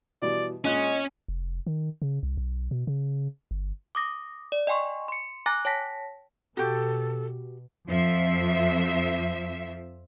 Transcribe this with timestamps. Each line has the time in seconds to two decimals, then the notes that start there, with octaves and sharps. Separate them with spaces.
0.22 B2 E3 G3 D5
0.65 A#2 G#3 C#4 D#5 D#6 F#6
1.28 F1
1.67 D#3
2.02 C#3
2.23 C2
2.37 B1
2.71 B2
2.87 C#3
3.51 G1
3.95 D6 D#6 A#6
4.52 D5
4.67 D#5 G5 G#5 C6 C#6
5.08 C6 C#7
5.46 G#5 A#5 D6 F#6 A6 A#6
5.65 C#5 G5 A5 A#6 B6
6.57 B2 F#4 G4 A4
7.88 F2 F3 E5